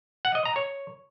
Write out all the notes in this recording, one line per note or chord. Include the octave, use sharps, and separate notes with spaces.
F#5
D#5
A#5
C#5